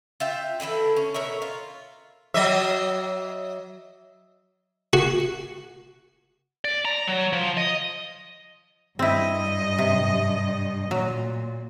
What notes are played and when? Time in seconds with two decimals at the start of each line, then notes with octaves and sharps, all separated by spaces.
0.20 F4 E5 G5
0.60 D3 E3 E4 A4
0.96 C#4
1.14 B2 A#4 C#5 E5
1.42 F4
2.34 F#3 D#5 E5
4.93 F#4
6.65 D5
6.85 A#5
7.07 F#3
7.33 F3
7.57 D#5
8.99 G2 C4 E4 D#5
9.78 C3
10.91 A#2 F#3